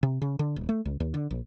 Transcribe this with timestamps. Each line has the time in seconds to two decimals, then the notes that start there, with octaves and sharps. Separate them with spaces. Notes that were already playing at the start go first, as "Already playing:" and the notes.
0.03 C3
0.22 C#3
0.39 D3
0.56 D#1
0.69 A3
0.85 C#2
1.00 D#2
1.14 D3
1.31 A#1